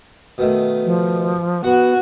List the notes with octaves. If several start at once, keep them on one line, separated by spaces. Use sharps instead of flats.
B2 D#3 A3
F3
B3 F#4 F#5